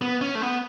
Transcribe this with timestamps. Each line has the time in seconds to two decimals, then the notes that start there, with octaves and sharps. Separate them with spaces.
0.02 B3
0.21 C#4
0.35 A3
0.42 B3